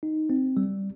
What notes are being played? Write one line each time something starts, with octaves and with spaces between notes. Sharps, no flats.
D#4
C4
G3